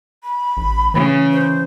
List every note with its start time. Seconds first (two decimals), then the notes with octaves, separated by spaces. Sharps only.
0.24 B5
0.57 A1
0.94 C#3 E3
1.32 C5